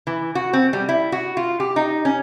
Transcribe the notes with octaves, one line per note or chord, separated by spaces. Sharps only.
E3
F#4
C4
G3
E4
F#4
F4
G4
D#4
C#4